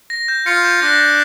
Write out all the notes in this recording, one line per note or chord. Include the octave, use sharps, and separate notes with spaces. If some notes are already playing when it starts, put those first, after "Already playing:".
A#6
G6
F4 C#7
G6
D4 A#6
G6